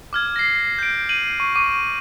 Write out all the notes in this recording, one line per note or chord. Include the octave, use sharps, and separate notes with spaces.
D6 F6 G#6
A#6 C7
G6 D7
D#7 F#7
C#6
C#6 D6 D#7